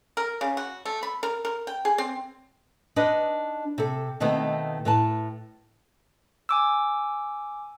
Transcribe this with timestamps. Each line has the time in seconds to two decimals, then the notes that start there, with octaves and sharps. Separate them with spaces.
0.17 A#4
0.41 C#3
0.57 F#4
0.85 A3
1.03 B5
1.23 A#4
1.45 A#4
1.67 G5
1.85 G#4
1.98 C4
2.96 D4 D#4 B4 D#5
3.78 C3 A4
4.20 B2 D#3 A3 B3 C4
4.85 A2 B4 A5
6.49 G#5 D6 E6